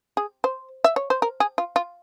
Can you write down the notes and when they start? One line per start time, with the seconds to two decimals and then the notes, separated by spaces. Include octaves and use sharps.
0.17 G#4
0.44 C5
0.84 E5
0.96 C#5
1.10 C5
1.22 A#4
1.40 G#4
1.58 F4
1.76 F4